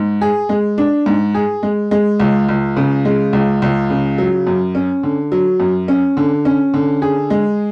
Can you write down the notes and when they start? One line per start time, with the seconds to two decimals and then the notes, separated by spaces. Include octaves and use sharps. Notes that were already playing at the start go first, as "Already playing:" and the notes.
Already playing: G#2
0.21 G#4
0.49 G#3
0.78 D4
1.06 G#2
1.34 G#4
1.63 G#3
1.91 G#3
2.20 C#2
2.49 C#2
2.77 C#3
3.05 G#3
3.33 C#2
3.62 C#2
3.90 C#3
4.18 F#3
4.47 F#2
4.75 C#4
5.03 D3
5.32 F#3
5.60 F#2
5.88 C#4
6.17 D3
6.45 C#4
6.74 D3
7.02 G#4
7.30 G#3